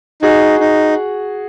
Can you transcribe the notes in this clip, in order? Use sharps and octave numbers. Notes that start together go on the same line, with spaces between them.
D#4 F#4 G#4
D#4